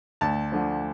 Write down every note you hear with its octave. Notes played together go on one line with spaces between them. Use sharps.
D2 A5
D3 F3